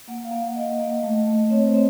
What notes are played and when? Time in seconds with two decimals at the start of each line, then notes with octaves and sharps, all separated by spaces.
0.08 A#3 F#5
0.24 F5
0.31 A#3
0.40 F#5
0.56 A#3 D#5
0.80 A#3
1.03 A3
1.27 A3
1.50 C4 C#5
1.67 C5
1.74 C4